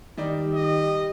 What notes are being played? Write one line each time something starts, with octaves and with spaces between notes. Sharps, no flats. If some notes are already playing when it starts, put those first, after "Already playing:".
D#3 G3 D#4 G4 D5
D#5